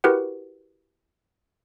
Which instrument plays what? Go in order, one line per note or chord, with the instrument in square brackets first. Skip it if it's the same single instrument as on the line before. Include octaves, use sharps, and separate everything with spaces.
[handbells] E4 F#4 G4 A#4 B4 F#5